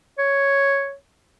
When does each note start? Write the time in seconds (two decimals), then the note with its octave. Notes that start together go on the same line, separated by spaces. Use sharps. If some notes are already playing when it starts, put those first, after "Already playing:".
0.19 C#5